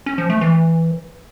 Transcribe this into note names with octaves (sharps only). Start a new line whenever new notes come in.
C#4
F3
A3
E3